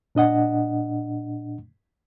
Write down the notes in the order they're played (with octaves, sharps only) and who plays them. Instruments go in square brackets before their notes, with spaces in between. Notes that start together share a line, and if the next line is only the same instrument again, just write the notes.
[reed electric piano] A#2 D4 D#5 F#5